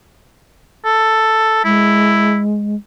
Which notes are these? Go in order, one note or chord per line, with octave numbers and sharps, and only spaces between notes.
A4
G#3 E4